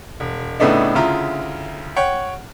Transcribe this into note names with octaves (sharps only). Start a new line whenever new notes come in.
E1
A2 C#3 A3 B3 D4 D#4
D2 C#3 E4 F4 A#5
C#5 F#5 G5